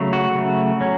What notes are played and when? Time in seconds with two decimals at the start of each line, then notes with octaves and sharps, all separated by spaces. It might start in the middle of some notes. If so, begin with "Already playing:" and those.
Already playing: C#3 F#3 A3
0.13 F#4
0.35 C#3 F#3 A3
0.81 F#3 C#4